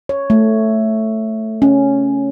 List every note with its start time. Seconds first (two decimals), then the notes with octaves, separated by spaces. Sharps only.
0.09 C#5
0.30 A3
1.62 C#4